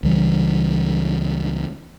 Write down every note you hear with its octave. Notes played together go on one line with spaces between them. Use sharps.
C#2 E3 G3